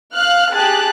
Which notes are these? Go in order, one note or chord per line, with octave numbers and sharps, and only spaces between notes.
F5 F6 F#6
G4 G#4 A5 F#6